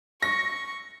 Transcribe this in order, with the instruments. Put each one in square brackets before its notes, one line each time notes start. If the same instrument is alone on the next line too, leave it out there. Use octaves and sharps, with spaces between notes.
[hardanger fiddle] C#6 [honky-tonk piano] A#6